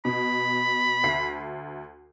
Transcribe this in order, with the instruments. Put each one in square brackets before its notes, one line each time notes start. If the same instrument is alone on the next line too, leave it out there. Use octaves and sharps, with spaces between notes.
[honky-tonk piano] B2 [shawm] B5
[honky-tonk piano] D2 E5 C7